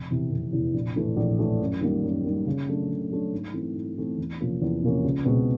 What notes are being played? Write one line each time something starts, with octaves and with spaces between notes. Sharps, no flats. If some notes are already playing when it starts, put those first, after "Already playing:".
Already playing: F1
E2 C3 E3
F1
E2 C3 E3
A#1
A2 E3 A3
A#1
A2 E3 A3
F#2
D#3 G3 A#3
F#2
D#3 G3 A#3
C#3
F#3 A3 D4
C#3
F#3 A3 D4
G#2
E3 A3 C4
G#2
E3 A3 C4
E2
C3 F3 A#3 C#4
E2
C3 F3 A#3 C#4
C#2
B2 G#3 C4